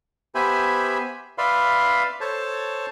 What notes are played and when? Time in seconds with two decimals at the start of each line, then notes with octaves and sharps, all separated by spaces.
0.35 B3 G4 C5 E5 G#5 B5
1.38 B4 D5 E5 F5 B5 C6
2.21 A4 C5 C#5 A5